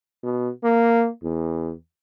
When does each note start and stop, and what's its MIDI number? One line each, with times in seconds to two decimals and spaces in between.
0.23 0.49 47
0.64 1.08 58
1.23 1.73 40